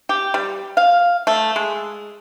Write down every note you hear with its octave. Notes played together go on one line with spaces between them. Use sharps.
G4
G3
F5
A3
G#3